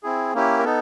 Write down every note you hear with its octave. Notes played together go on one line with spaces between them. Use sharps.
C4 E4 G#4
A#3 C#4 E4 G4
A#4
B3 D#4 A4